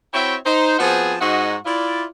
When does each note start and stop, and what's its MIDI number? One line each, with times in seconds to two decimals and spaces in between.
0.13 0.36 60
0.13 0.36 64
0.13 0.36 66
0.13 0.36 73
0.13 0.36 76
0.13 0.36 79
0.45 0.77 63
0.45 0.77 72
0.79 1.15 53
0.79 1.15 59
0.79 1.15 60
0.79 1.15 66
0.79 1.15 68
0.79 1.15 81
1.20 1.56 44
1.20 1.56 66
1.20 1.56 75
1.66 2.04 64
1.66 2.04 65
1.66 2.04 74